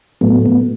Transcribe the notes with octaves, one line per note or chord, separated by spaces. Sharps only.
A2 F#3 A3 B3
B3